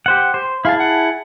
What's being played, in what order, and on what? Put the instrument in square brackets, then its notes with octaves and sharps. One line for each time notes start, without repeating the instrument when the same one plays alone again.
[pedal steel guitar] G4 C5 F#5
C5
[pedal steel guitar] E4 G#4 A5 [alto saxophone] F5
[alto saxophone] F#5